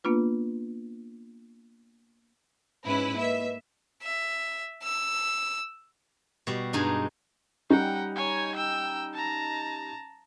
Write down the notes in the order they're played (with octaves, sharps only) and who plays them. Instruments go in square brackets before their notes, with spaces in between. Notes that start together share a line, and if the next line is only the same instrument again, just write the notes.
[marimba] A#3 B3 D4 F4 B4
[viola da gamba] G#2 C#4 [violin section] E4 B4
[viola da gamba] A#3 [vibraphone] B4 D#5 [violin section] E5
[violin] E5
E6
[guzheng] B2 G3
G2 G#3 D#4 G#5
[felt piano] G3 C#4 D#4 [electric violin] F#5 G5
[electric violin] C#5 G#5
G5 E6
A5 A#5